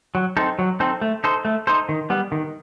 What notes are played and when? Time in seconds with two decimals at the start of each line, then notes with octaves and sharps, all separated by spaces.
0.15 F#3
0.37 C4 D#4 A4
0.59 F#3
0.80 C4 D#4 A4
1.01 A3
1.24 D#4 A4 C5
1.45 A3
1.67 D#4 A4 C5
1.89 D#3
2.10 G3 B3
2.32 D#3